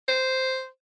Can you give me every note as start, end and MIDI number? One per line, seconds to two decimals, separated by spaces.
0.08 0.67 72